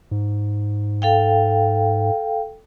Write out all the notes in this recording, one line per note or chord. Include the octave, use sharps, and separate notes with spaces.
G#2
A4 F5 G5